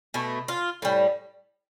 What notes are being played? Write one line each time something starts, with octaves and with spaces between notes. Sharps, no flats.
B2 A3
F4
A2 G3